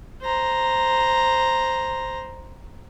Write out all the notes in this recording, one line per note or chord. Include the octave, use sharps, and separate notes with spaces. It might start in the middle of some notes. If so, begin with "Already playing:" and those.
C5 A#5